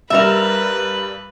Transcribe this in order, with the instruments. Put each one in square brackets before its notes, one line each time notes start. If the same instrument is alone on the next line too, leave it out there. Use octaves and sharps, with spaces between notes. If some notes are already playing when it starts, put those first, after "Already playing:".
[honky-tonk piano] G2 G3 E7 [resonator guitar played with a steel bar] A#4 E5 [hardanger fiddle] B4